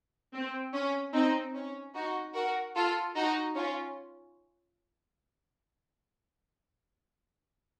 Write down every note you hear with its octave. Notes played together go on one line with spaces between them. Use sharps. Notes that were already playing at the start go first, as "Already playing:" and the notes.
C4
C#4
C4 D#4
C#4
D#4 F#4
F#4 A#4
F4 A4
D#4 F#4
C#4 F4